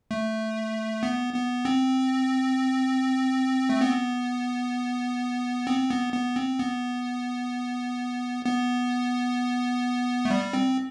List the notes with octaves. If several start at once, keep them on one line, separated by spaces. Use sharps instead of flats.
A3
B3
B3
C4
A3
B3
C4
B3
B3
C4
B3
B3
A3
G3
C4